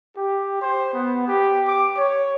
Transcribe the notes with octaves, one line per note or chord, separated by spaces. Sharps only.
G4
C5
B3
G4
D6
C#5